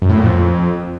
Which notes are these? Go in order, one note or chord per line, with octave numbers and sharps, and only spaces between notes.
F#2
A2
A#2
F2